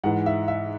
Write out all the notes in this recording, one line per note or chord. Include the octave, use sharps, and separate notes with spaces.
G#2 E3 F#5
E5
E5